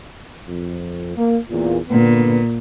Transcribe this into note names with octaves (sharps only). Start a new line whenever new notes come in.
F2
A#3
E2 A#2
A#2 D3 B3